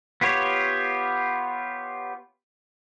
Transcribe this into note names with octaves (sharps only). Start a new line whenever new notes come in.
B3 F4 G4 C#5